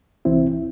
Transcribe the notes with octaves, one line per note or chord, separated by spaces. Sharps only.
C2 C3 E3 C4 E4